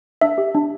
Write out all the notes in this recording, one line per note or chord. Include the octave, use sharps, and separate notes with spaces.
D4 E5
G4
D4